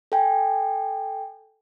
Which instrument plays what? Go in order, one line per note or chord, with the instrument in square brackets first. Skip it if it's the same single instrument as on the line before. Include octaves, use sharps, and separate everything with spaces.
[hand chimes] A4 G5 G#5